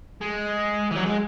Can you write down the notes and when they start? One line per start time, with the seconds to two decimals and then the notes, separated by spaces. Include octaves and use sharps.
0.21 G#3
0.91 E3
0.96 F#3
1.05 G#3